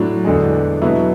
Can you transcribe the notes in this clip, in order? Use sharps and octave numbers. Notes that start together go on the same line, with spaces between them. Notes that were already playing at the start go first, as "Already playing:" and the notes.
Already playing: A2 F#3 D4
E2 D3 G#3
B2 F#3 E4